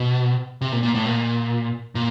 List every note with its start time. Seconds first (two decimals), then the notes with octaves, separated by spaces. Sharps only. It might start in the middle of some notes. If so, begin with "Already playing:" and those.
Already playing: B2
0.61 C3
0.72 A#2
0.83 A#2
0.95 A2
1.06 A#2
1.95 A#2